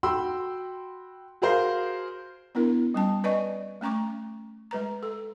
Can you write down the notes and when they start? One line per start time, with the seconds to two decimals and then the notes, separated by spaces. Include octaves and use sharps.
0.03 F#4 G5 B5 C6 E6
1.42 F#4 G#4 A#4 C5 F5
2.55 B3 D4 E4 A#4
2.94 G3 C#4 A5
3.24 B4 D5 D#5 G#5 C#6
3.81 A3 C#4 A#5 C#6 D6
4.71 G#3 B4 A#5
5.03 A4